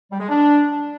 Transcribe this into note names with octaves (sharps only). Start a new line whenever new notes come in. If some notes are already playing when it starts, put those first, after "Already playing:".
G3
G#3
D4